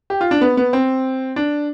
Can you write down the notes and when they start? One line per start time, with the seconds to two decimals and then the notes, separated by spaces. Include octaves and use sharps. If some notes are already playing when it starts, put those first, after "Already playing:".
0.10 G4
0.21 F4
0.31 D4
0.41 B3
0.57 B3
0.73 C4
1.36 D4